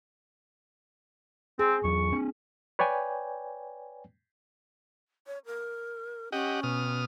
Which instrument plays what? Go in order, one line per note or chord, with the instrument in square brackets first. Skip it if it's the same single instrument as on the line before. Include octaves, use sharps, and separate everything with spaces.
[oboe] C4 [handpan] G#4
[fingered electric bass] E2 F#3 [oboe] C#6
[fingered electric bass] C4 D4
[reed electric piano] B4 C#5 D5 G5 G#5
[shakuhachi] C#5
A#4
[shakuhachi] C#4 [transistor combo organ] G4 D#5 F#5
[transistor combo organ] B2 D#6 F6